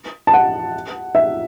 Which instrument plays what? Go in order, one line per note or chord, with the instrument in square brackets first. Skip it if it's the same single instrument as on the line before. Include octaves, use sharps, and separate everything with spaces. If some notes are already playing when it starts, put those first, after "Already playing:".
[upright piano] A5
F#5
E5